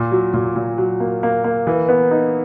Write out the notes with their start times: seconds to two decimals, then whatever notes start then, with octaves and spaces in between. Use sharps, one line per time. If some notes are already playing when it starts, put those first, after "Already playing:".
Already playing: A#2
0.11 F#3
0.34 A#2
0.56 A#2
0.78 F#3
1.00 A#3
1.23 A#3
1.44 A#3
1.67 E3
1.88 B3
2.11 D#4